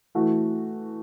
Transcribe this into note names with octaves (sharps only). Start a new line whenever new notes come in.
E3 A3 F#4